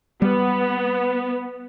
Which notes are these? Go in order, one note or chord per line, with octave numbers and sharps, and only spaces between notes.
G3 B3